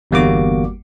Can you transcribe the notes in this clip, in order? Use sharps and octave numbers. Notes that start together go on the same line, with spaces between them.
G1 E2 G3 A#3 F#4 D6